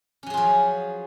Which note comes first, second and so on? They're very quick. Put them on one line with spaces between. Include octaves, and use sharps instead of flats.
C#4 F#3 G#4 F4 F3